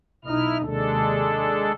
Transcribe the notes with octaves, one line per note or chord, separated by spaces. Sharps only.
B1 D#4 E4 F6
D#2 C3 G#3 D4 A4